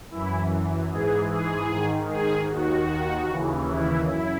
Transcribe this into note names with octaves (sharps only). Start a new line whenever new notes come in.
F#2 E3 E4
G#2 E3 G#4
G#4
G#2 D#3
G#4
D#2 D#3 F#4
D#2 C#3 E3
E4
F#2 E4